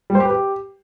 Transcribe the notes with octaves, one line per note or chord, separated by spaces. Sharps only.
G3
C5
G4
B4
G4